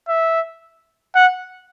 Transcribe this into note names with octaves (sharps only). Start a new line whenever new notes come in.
E5
F#5